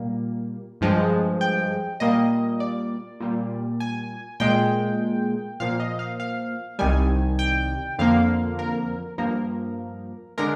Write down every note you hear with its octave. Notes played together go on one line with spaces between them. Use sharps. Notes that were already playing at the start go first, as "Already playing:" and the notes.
Already playing: A#2 G3 A#3
G2 F3 G#3
G5
A#2 G3 A#3 D#5
D5
A#2 G3 A#3
G#5
A#2 G#3 G5
A#2 F3 A#3 F5
D#5
F5
F5
C2 C3 D#3 G3 G#5
G5
F2 D3 F3 A#3 F5
A#4
G2 F3 A#3 A#4
D3 G#3 A#4